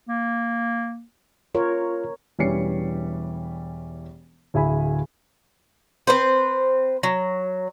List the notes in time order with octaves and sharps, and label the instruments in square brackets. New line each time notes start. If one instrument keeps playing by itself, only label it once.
[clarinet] A#3
[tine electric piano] F4 [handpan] A#4 C#5
[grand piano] E1 E3 G3 C#4 C7 C#7
D1 E4 G#4 E5 G#5 B5
[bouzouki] C4 B4 C5
F#3